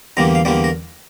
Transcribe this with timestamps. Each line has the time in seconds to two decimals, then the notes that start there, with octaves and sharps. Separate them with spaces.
0.17 E2 D3 G3 A#3 A#5
0.35 F5
0.45 E2 D3 G3 A#3 D5
0.64 A#4